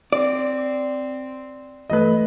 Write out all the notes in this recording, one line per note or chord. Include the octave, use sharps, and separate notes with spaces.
C4 D5
G1 E3 A3 B4 D#5